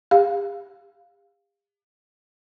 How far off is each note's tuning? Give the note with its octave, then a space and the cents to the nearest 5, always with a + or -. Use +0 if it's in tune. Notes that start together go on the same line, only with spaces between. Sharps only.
G4 +45 F5 +0